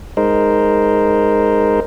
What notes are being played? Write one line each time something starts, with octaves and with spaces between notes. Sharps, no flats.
G#3 D#4 A#4 C5